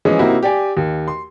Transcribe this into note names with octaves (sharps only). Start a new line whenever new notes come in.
E3 F3 G#3 C#4
C3 A#3 C4 D#4 E4 F#4
G4 D5 G#5
D#2
C6